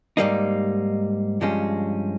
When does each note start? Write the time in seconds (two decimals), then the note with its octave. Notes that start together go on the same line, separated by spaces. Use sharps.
0.17 G#2 G3 A#3 D#4
1.41 G2 F3 G#3 C#4